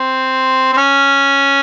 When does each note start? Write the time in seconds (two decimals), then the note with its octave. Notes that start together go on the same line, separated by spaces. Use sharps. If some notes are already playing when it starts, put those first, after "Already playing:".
Already playing: C4
0.73 C4
0.77 C#4